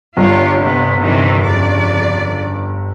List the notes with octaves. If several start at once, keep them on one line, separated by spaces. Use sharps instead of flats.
G1 G2 F4 G4 C#5
C3 B3
C3 D#3 E3
F2 C#3 D5